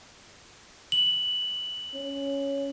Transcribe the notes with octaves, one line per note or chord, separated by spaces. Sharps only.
F#7
C#4